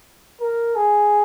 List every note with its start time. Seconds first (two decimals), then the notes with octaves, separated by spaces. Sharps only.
0.41 A#4
0.76 G#4